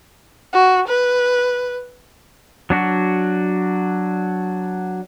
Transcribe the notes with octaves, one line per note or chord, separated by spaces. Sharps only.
F#4
B4
F#3 D4 F#4